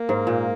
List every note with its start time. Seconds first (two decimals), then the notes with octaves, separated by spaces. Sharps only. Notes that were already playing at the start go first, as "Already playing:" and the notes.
Already playing: A#3
0.09 G#2
0.27 A#2